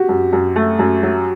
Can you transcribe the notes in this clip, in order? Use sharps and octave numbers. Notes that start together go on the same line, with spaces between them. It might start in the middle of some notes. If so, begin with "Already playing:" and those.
Already playing: F#4 G4
F#2
F#2
A3
F#2
F#3